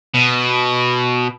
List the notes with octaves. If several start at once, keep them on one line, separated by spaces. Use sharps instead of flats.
B2